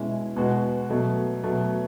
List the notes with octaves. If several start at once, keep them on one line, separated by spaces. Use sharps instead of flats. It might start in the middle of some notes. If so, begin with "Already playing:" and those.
Already playing: B2 G#3 C#4 E4
B2 G#3 B3 F#4
B2 F#3 A3
B2 F#3 A3